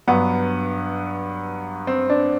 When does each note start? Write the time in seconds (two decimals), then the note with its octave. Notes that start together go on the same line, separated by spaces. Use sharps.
0.07 G2 F#3 B3
1.87 C4
2.09 D4